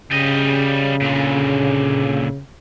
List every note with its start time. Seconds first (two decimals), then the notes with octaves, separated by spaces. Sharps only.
0.11 C#3 G3 D#5
1.01 A#2 D3